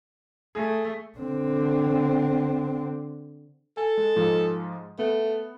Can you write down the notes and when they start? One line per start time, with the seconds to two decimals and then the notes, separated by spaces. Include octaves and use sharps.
0.55 A3 G#4
1.18 D3 C4
3.77 A4 G#5
3.97 G#3
4.16 G#2 F3 G#3
4.99 A3 B3